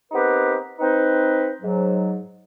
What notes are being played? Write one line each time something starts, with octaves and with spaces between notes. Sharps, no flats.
B3 C4 D#4 G4 A#4 B4
C4 D#4 B4
G#2 F#3